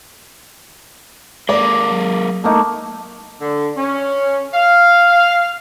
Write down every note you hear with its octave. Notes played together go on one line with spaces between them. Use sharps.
G#3 A#3 D5 D6
F#3
A3 A#3 D#4
D3
C#4
F5